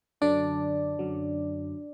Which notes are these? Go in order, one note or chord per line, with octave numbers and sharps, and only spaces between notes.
F#2 D3 F#3 D4 D5
F#2 D3 F#3